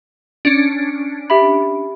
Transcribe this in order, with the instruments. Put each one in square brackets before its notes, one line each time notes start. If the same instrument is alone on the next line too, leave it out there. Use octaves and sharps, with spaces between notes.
[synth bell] C#4 D4
[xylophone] G4 E5 B5